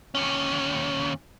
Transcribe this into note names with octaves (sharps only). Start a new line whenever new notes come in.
D#2 C#4